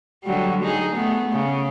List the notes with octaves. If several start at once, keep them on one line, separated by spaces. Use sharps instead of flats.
D3 F#3 G3
D#4 G#4
A3 B3
C#3